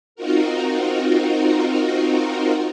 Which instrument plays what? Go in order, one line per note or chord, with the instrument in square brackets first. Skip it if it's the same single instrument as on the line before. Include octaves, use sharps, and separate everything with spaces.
[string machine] C4 D#4 F4 F#4 A#4